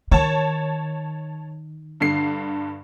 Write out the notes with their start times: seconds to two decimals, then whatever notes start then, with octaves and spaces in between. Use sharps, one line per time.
0.12 D#3 C#5 A5
2.00 G2 D3 C7